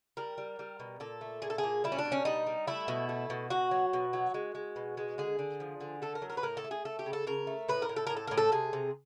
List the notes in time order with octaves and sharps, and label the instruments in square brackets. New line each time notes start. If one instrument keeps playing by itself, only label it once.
[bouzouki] G3 A#4
G3
G3
B2
A#2 A4
A3
A#2 G#4
A4
G#4
A#2
G3 E4
C#4
D4
B2
C#4
G3 D#4
G3
A3 E4
B2
A3
B2
B2 F#4
F#3
B2
F#3
G#3
G#3
B2
G#3
D3 G#4
D3
F3
D3
A3 A4
A#4
F#3
A#4
B4
A2 A#4
A4
A3
G#4
A3 A4
G4
C#3
A4
C#3 A#4
A3
A2 B4
A#4
A2
A4
A2 A#4
A4
A2 A#4
A4
C3 G#4
C3